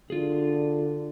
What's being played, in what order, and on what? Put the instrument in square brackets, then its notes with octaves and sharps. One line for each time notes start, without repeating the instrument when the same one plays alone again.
[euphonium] D3 [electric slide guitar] F4 G#4